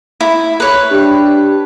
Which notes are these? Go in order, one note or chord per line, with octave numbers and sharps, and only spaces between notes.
E4
B4 C#5
D4 G4